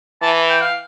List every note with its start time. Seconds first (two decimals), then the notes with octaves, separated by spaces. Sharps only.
0.22 E3 A5
0.50 G5
0.61 F5